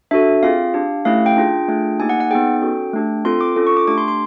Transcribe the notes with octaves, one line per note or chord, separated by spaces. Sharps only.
D4 F#4 A4 E5
C4 F4 G#4 F5
D4 G4
A3 C#4 E4 G4 F5
G5
D4 F4 G#4
A3 D4 F4 G#4
A#3 D#4 G4 G#5
F#5
F#5
B3 D#4 G#4 G5
C#4 F#4 A4
A3 D4 G4
C4 F4 A4 C6
D6
C#4 F4 A4
C#6
D6
A3 D4 G4 D6
C6
C6